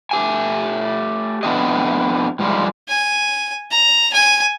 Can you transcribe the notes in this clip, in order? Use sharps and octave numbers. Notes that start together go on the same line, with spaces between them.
A3 G4 G#5
F2 B3 D4 G4 D#5
G#2 F3 G3 G#3
G#5
A#5
G#5